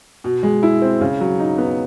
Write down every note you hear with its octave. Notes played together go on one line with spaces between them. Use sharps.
B2
G#3
E4
C4
C#3
F#3
D#4
B3